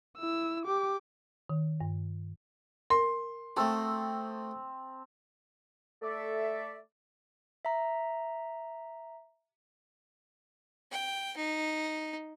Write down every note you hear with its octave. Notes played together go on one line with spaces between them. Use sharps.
E4 E6
G4 D6
D#3
G2
A#4 C6
A3 C4 F#4 A5 D#6
A3 A4 D5 E5
E5 A#5
G5
D#4